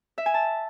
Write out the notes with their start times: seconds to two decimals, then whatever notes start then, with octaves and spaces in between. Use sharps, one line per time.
0.18 E5
0.26 G#5
0.34 A5